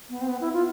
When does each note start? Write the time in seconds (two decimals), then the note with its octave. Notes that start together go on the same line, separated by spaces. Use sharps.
0.10 B3
0.21 C4
0.28 B3
0.41 E4
0.53 F4